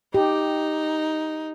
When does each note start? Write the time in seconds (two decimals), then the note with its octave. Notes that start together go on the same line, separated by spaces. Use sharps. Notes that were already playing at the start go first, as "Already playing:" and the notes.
0.14 D#4 G4